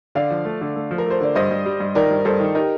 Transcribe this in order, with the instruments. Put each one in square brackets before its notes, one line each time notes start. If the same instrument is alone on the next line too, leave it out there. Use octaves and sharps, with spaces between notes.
[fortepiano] D3 [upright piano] D5 F5
[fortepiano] F3
A3
D3
A3
F3
[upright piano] A#4
[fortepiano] A3 [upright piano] C5
[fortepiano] D3 [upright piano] D5
[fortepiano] G2 [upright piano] C5 D#5
[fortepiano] G2
G3
G2
[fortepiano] D#3 [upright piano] A#4 D5
[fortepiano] G2
[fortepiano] G2 [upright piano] A4 C5
[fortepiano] D#3
[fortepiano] D#4 [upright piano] G4 A#4